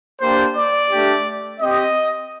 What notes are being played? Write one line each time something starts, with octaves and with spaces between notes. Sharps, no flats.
A#3 D4 G4 C5
D5
A3 D4 G4
C4 G4 D#5